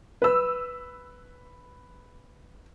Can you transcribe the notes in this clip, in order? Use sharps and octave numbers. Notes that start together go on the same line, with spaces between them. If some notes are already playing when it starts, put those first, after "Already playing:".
B4 E6